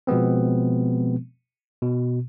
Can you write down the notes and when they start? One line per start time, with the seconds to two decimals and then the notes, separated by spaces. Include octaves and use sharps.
0.07 B2 F3 G#3 B3 C4
1.82 B2